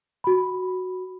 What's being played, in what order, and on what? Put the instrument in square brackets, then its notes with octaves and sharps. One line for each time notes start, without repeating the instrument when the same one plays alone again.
[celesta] F#4 B5